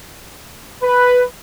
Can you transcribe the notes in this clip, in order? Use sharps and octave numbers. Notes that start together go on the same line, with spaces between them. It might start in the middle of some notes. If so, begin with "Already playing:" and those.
B4